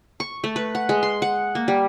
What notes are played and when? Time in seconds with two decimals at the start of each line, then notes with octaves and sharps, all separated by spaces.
0.20 C#6
0.44 A3
0.56 B4
0.75 F#5
0.89 G#3
1.03 C6
1.22 F#5
1.55 A#3
1.68 G3